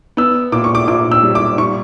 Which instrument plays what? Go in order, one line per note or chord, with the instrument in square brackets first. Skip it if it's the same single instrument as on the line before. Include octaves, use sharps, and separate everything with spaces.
[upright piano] B3 E6
A#2 D6
C#6
D6
A#2 D6
E6
G3
D6
G3 C#6